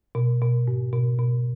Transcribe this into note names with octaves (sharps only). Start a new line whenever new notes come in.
B2
B2
G#2
B2
B2